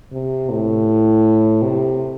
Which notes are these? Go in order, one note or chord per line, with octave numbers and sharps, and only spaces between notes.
C3
A2
C3